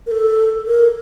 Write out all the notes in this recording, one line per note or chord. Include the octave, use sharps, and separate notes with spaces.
A#4
A4
A#4